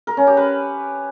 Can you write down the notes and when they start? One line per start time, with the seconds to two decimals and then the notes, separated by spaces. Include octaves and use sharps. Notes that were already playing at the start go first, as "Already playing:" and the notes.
0.07 A#4
0.17 C#4
0.27 G4
0.37 B4